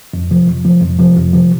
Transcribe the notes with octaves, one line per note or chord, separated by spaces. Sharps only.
F2
C3 F3
F2
C3 F3
F2
C3 F3
F2
C3 F3